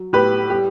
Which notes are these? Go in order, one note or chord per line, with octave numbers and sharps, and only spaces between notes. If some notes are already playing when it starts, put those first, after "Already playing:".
Already playing: F#3
A2 G4 B4
G3 G4